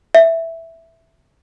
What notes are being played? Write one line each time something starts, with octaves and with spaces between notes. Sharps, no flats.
E5